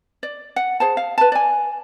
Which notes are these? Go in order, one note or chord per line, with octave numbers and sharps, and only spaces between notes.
D5
F#5
G#4 C5 A5
F5
B4 A5
D5 G#5